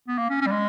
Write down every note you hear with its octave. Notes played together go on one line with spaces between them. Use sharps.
B3
A#3
C#4
C#4
G3
G#3